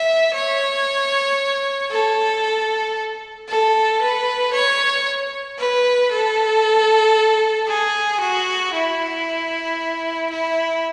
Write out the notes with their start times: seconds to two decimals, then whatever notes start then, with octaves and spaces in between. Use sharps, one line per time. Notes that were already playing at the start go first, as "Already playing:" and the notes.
Already playing: E5
0.34 C#5
1.91 A4
3.49 A4
4.01 B4
4.53 C#5
5.58 B4
6.11 A4
7.68 G#4
8.20 F#4
8.73 E4
10.30 E4